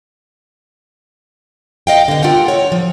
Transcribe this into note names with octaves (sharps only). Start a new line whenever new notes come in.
D#5 F5 G5
D3 B3
F4 G4 A4 A#4 F#5 G5
C#5
F3